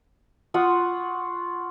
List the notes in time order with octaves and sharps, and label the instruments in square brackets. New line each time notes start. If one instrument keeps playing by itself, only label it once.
[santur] F4 F#5 C#6 D#6